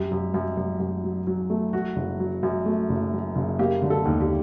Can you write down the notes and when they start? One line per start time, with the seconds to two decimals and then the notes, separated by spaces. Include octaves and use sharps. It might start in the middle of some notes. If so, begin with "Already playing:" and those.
Already playing: F#2 G4
0.11 F#2
0.34 F#2
0.57 F#2
0.80 F#2
1.04 F#3
1.27 F#3
1.50 A3
1.73 F#3 F#4
1.96 F#1
2.20 F#3
2.43 F#2
2.66 A3
2.89 F#1
3.13 F#3
3.36 F#1
3.59 A#3 G4
3.82 D3
3.90 A4
4.05 D#2
4.21 G4